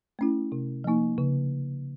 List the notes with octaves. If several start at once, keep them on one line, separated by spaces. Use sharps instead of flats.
A3 C#4 E4
C3
F3 A#3 D#4
C#3